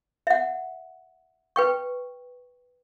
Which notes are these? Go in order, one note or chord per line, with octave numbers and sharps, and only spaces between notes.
E5 F#5
B4 G5 C#6